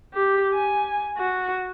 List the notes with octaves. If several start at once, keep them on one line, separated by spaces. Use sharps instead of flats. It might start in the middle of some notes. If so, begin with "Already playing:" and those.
G4
G#5
F#4